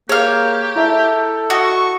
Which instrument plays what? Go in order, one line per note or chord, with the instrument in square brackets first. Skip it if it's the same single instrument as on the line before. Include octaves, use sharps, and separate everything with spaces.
[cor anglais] A#3 [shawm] G4 [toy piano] G#4 [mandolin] C#5 F5
[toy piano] E4 E5 [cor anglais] A4
[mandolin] F#4 [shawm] D#5
[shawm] C#6